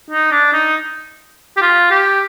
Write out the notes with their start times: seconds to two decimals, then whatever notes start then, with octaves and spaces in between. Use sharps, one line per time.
0.10 D#4
0.31 D4
0.53 D#4
1.57 G4
1.62 F4
1.90 G4